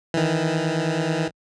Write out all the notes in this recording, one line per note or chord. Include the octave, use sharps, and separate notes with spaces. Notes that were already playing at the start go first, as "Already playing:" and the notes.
D#3 E3